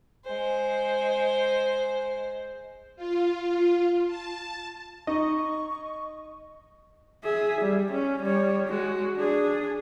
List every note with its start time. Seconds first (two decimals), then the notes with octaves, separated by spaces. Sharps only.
0.25 G#3 C5
2.96 F4
4.07 A5
5.07 D#4 D#5 C#6
7.24 G#4 E5
7.61 G3
7.91 C#4
8.23 G3 C#5
8.68 G#3 F#4
9.17 D4 G#4